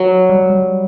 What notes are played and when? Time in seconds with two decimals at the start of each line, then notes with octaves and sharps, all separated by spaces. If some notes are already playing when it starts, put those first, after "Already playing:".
Already playing: F#3
0.30 G3
0.50 G3